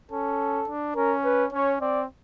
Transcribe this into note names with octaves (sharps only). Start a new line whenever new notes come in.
C#4 A4
D4
C#4 A#4
B4
C#4 C#5
C4 D5